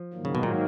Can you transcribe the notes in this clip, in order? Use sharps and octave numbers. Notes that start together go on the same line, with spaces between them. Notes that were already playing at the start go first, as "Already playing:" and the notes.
Already playing: F3
G#2 D#3 F#3 A#3
C#3
B2
A#2